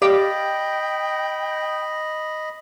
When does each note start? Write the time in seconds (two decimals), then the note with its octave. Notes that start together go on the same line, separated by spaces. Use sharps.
0.02 G4 D5 D#5 F5 G5 B5 D6